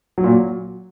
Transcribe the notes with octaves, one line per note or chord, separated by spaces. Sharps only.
F#3
A#2
F#3